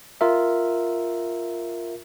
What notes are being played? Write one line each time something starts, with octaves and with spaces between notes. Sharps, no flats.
F4 A#4 E5